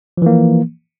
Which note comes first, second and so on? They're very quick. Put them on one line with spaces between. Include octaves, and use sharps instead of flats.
F3 E3 A#3